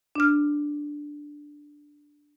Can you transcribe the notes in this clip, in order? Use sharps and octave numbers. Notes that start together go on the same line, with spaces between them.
D4 F6